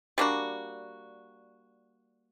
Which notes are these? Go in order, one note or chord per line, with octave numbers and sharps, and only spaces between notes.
G3 A#3 D4 F#4